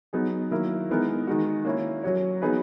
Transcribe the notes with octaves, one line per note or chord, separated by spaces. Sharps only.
F#3 B3 D#4 G#4
D#3 F#3 A#3 E4 A#4
E3 G#3 B3 D#4 A#4
D#3 G#3 D#4 F#4
A#3 C#4 E4
F#3 C#4 F#4 C#5
F#3 B3 D#4 G#4 B4